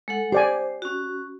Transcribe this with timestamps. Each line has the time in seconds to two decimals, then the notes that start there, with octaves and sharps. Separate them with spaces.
0.08 G#3 A4 F#5
0.32 G4 C5 D5 G#5
0.82 C#4 F#4